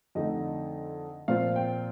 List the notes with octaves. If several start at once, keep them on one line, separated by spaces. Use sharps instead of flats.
F2 D3 A3 D#4 D#5
A#2 F3 C4 F4 F5
G5